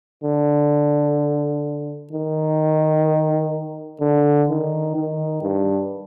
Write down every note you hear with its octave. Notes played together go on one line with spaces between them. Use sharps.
D3
D#3
D3
D#3
D#3
G2